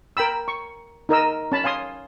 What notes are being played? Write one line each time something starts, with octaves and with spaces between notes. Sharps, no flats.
A#4 G5 B5 E6
C#6
D#4 A#4 D#5 E6
C#4 A5 B5
F5 G#5 C6 D#6